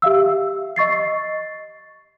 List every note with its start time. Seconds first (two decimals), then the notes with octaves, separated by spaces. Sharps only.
0.02 G4 E5 F5 E6
0.76 D#5 C#6 A6 C7